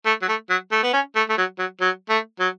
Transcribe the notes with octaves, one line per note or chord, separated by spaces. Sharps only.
A3
F#3
A3
F#3
A3
B3
C#4
A3
A3
F#3
F#3
F#3
A3
F#3